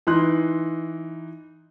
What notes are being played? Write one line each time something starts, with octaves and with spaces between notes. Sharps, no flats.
E3 D#4 C6 F#6